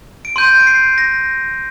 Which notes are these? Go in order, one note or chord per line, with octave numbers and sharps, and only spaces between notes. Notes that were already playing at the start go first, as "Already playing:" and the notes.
D7
C6 G6 D#7
D7
C7
A#6